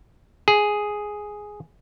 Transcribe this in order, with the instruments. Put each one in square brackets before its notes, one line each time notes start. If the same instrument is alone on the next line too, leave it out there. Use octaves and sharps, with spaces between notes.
[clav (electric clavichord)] G#4